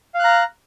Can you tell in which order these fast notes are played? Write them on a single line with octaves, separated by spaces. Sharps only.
F5 F#6 A#5